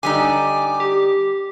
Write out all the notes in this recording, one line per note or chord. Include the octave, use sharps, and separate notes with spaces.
D3 G3 D#4 G#5 D6
G4